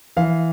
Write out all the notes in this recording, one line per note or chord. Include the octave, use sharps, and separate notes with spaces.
E3 F5